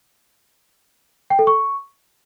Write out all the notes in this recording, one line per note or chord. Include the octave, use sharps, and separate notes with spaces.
G5
A4
C#6